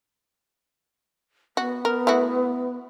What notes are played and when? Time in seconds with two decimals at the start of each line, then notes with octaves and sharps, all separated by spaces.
1.57 B3 F#4
1.85 A#4
2.07 A3 E4 F#4